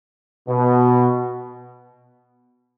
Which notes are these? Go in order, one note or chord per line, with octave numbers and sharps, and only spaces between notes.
B2